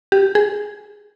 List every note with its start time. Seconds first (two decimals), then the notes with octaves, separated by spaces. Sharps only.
0.12 G4
0.35 G#4